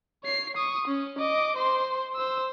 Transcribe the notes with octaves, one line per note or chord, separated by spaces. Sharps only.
C#5 C7
C#6 D#6
C#4
D#5 D6
C5 C6
C5 E6